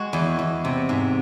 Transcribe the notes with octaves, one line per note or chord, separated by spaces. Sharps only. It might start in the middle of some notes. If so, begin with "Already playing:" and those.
Already playing: G#3 F#4
E2
E2
C3
G#2